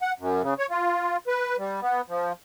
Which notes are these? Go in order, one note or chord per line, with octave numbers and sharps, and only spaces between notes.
F#5
F#2
C#3
C#5
F4
B4
G3
B3
F3